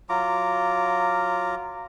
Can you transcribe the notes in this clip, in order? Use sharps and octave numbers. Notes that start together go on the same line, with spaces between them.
F#3 F4 A#5 D6